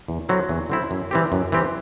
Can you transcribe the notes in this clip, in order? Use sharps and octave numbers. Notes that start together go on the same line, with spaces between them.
E2
D3 F#3 C4 E4
E2
D3 F#3 C4 E4
F#2
E3 G3 C4 G4
F#2
E3 G3 C4 G4